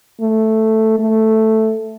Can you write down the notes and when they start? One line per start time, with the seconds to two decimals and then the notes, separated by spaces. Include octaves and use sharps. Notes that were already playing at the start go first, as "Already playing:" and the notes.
0.21 A3
0.99 A3